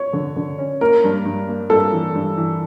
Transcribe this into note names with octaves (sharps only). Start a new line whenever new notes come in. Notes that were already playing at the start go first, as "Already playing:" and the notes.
Already playing: C#5
D3
D3
C#4
A#3 A#4
G2
G2
A#3
G2 A4
E3
G2
E3